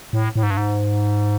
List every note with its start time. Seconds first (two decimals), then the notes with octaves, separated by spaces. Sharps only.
0.13 A2
0.36 A2
0.43 G#2
0.50 G2
0.57 G#2